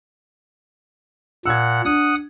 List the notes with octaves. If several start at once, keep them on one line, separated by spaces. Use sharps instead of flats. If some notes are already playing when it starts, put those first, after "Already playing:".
A#2 F#5 E6 G#6
D4 F#5 D#6